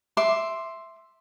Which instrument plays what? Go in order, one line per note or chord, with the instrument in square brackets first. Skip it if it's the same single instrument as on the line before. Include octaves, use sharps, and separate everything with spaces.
[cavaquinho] E5 C6 D6